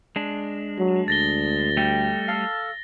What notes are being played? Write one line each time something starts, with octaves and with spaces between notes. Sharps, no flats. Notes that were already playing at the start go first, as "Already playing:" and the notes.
G#3 D4
F#3
D2 A6 A#6 G7
G3 A3 G5
A4 F5